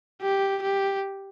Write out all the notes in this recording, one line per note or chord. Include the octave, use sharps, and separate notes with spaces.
G4
G4